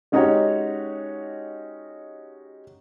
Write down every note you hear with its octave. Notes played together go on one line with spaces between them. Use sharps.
G#3 C#4 D#4 F#4 G4 C#5